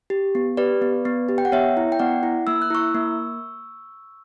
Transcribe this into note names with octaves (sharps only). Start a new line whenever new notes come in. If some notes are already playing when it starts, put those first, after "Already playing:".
G4
B3
G4 B4 D5
B3
B3
G4
G5
F#5
B3 C#5 E5
E4
G5
B3 D5 F#5
E4
A#3 E6
F#6
E4 C#6 E6
A#3